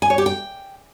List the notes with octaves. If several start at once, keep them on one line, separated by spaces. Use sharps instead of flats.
G#5
C#5
G4
G5